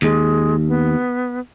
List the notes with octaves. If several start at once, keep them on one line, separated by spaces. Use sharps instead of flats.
D#2 G#3
B3